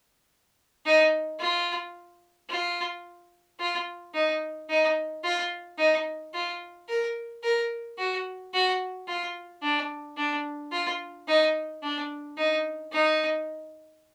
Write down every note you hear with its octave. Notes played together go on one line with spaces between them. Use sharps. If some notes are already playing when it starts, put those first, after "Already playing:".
D#4
F4
F4
F4
D#4
D#4
F4
D#4
F4
A#4
A#4
F#4
F#4
F4
D4
D4
F4
D#4
D4
D#4
D#4